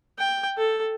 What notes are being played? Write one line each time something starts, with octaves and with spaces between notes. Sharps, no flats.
G5
A4